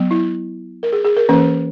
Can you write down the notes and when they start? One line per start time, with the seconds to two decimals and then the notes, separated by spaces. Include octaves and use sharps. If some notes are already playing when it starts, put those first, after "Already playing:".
Already playing: F#3 B3
0.11 E4
0.83 A#4
0.93 G#4
1.04 G#4
1.17 A#4
1.29 E3 A#3 C#4 B4